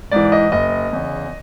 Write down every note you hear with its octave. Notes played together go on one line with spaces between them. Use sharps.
G#2 E3 D5
D#5
F#1 D#5
E2 C#3